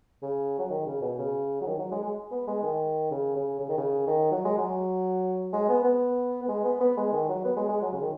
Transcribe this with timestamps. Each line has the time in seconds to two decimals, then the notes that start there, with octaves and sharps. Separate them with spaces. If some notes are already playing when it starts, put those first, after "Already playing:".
0.22 C#3
0.59 F#3
0.70 D#3
0.87 C#3
1.02 B2
1.19 C#3
1.61 F#3
1.67 D#3
1.78 F#3
1.91 G#3
2.03 G#3
2.31 B3
2.47 G#3
2.63 D#3
3.11 C#3
3.36 C#3
3.60 C#3
3.69 D#3
3.78 C#3
4.07 D#3
4.31 F#3
4.45 G#3
4.58 F#3
5.53 G#3
5.69 B3
5.84 B3
6.42 B3
6.48 G#3
6.64 B3
6.81 B3
6.97 G#3
7.12 D#3
7.29 F#3
7.45 B3
7.57 G#3
7.69 G#3
7.81 F#3
7.93 C#3
8.02 D#3